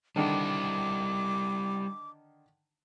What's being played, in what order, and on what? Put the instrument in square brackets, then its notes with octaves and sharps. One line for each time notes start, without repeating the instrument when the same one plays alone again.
[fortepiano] D3 D#3 D4 [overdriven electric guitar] G3 E4 [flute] D6